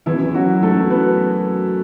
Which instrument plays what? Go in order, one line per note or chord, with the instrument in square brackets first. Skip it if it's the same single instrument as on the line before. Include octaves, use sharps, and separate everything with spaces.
[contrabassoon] E2 [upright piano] E3 E4
[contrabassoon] F#2
E2
[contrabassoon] F#2 [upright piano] F#3 F#4
[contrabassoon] G#2 [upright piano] A3 A4
[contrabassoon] F#2
E2
[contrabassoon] F#2 [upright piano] B3 B4